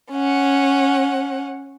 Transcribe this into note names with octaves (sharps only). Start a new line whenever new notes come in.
C#4 F#5